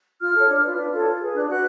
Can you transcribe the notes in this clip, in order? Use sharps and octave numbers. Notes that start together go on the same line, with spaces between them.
F4 F6
A4 C#5
D4
F4 B4
D4
F4 A4 C#5
F4
G#4 B4
D4 F#6
F#4 B4 F#6